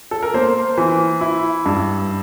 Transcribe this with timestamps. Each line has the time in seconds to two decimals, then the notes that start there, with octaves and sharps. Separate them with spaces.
0.11 A4
0.23 A#4
0.34 A#3 C5
0.78 E3
1.21 E4
1.66 G2